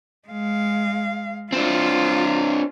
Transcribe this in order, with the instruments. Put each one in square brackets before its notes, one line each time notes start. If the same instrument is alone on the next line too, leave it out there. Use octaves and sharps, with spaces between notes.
[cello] G#3 F5
[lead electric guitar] C4 D4 [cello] F4